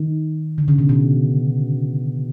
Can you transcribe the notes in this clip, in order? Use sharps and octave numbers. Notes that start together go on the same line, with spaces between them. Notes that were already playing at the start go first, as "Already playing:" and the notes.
Already playing: D#3
D3
C#3
B2
B2